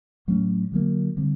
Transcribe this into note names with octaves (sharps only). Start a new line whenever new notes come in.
A2 F#3 A3 C#4
D3 F#3 A#3
D3 G3 C4